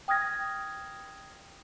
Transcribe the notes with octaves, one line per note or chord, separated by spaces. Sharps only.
G5 D#6 F6 G#6 A#6